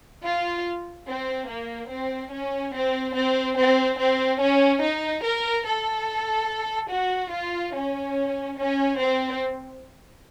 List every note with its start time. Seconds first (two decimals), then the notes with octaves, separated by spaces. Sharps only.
0.23 F4
1.07 C4
1.48 A#3
1.89 C4
2.31 C#4
2.74 C4
3.15 C4
3.57 C4
3.98 C4
4.40 C#4
4.81 D#4
5.23 A#4
5.65 A4
6.89 F#4
7.31 F4
7.74 C#4
8.56 C#4
8.98 C4